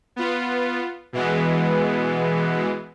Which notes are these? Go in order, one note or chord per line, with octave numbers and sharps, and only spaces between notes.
B3 F4
B2 E3 G#3 B3